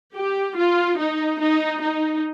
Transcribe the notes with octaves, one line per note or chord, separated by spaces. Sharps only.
G4
F4
D#4
D#4
D#4